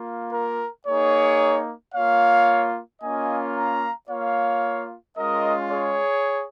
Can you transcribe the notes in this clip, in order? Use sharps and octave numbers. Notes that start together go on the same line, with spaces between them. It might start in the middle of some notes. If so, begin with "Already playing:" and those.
Already playing: A#3 F4
A#4
A#3 D#4 G#4 C#5
A#3 F4 C#5 F5
A#3 C#4 F4 D#5 G#5
F5 A#5
A#3 F4 C#5 F5
G#3 C#4 F4 A#4 D#5
G#4 C#5